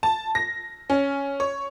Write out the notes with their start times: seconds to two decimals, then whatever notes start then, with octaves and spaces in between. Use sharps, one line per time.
0.03 A5
0.35 A#6
0.90 C#4
1.40 C#5